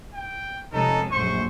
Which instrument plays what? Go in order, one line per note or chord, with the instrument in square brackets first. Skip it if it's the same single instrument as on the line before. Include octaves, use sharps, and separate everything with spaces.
[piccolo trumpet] G5
[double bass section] F1 C#4 [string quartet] G#3 [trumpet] D#4 [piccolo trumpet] A4
[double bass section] A#1 F#2 A2 [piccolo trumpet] C5 [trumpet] C#6